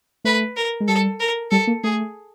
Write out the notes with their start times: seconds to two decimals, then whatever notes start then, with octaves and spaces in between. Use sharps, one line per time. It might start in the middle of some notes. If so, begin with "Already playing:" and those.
0.24 A3 B4
0.57 A#4
0.80 G#3
0.88 G3 A4
1.20 A#4
1.51 G3 A4
1.67 A#3
1.83 A3 G#4